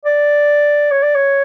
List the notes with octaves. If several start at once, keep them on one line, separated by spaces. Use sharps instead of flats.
D5
C#5
D5
C#5